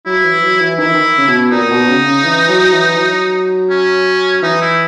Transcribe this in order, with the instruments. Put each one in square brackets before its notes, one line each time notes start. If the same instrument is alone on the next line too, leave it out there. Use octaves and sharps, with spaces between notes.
[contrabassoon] F#3 [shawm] E4
[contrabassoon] E3
F#3
E3
[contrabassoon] D#3 [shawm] E4
[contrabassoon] E3
D#3
C#3
B2
[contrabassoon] A#2 [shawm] D#4
[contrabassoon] B2
C#3
C#3
E3
F#3
E3
F#3
[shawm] C#4
[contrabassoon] E3 [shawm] D#4
[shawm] E4